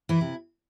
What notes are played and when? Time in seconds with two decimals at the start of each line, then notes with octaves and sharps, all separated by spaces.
0.09 E3 E4
0.21 C3